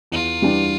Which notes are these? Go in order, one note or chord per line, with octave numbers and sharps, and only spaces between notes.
E2 F4
E3 G3 D4